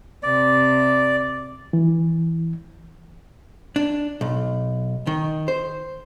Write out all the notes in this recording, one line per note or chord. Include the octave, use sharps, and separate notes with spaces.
C3 D5
E3
D4
B1
D#3
C5